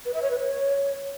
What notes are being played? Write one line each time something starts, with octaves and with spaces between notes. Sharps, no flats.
B4
E5
C#5
B4
C#5